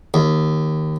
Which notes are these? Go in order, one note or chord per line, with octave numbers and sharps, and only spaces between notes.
D#2